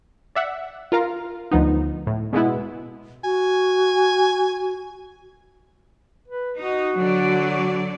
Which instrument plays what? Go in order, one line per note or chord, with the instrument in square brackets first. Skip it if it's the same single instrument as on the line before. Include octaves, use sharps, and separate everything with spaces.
[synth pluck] D5 E5 F#5
F4 A#4 F5 A#5
D2 F3 B3 D#4
A2
B2 G#3 B3 E4
[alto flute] F#4 [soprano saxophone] G#5
[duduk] B4
[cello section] D#4 [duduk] F#4
[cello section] D3 F#3 D5
[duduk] F#4